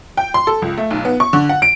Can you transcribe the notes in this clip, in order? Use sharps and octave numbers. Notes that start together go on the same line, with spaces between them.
G5
C6
A4
C#2
A3
B1
B3
C#6
D3
F#5
D7